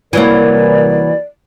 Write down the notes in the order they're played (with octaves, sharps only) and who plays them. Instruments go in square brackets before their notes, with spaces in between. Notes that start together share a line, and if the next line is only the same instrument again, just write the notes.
[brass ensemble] C2 A#4 [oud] E3 F#3 A#3 [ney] D5